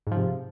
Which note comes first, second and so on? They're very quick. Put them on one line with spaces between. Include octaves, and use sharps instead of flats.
G#2 F3 C3